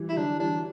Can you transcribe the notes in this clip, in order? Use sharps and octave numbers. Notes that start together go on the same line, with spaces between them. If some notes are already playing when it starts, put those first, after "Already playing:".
Already playing: E3 G3
E4
G3
D3 F#3 D4
E3 G3 D4